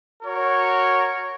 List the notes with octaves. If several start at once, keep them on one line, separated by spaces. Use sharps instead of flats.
F#4 A#4 C#5